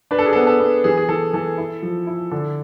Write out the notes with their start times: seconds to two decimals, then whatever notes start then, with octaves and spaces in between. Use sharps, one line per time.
0.11 D4 B4
0.19 A4
0.26 G#4
0.33 B3 A4
0.47 A4
0.60 B3
0.84 E3 G#4
0.97 G#4
1.09 E3 A4
1.33 E3 A4
1.58 E4
1.83 F3
2.07 E4
2.31 D3 A4